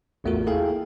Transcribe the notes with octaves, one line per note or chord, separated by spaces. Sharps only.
A1 E2 A3 F4 F#4 A#4
A#3 E4 G#4 A4 F5 G5